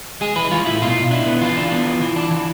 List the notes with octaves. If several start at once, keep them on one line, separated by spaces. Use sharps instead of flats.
G#3 G#4
E3 B4
G#3 F4
A2 E4
B2 F4
B2
D4 E4
B3
E3 F4
D4
B3
E3
E3
D4
E3